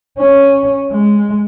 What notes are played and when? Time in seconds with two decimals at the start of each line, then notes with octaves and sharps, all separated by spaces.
0.19 C#4
0.92 G#3